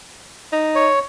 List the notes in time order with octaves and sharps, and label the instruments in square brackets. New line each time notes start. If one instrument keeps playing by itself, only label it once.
[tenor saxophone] D#4
[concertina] C#5